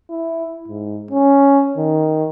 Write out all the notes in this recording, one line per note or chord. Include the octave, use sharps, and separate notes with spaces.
E4
G#2
C#4
D#3